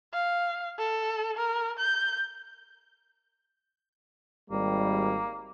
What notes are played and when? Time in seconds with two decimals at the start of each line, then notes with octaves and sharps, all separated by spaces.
0.13 F5
0.78 A4
1.37 A#4
1.79 G6
4.51 G#1 G3 A#3